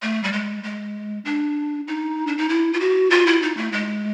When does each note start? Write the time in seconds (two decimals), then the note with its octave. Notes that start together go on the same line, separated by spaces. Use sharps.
0.02 A3
0.24 G3
0.33 G#3
0.63 G#3
1.25 D4
1.88 D#4
2.27 D4
2.38 D#4
2.49 E4
2.73 F4
2.80 F#4
3.10 F4
3.27 E4
3.42 D#4
3.57 A3
3.72 G#3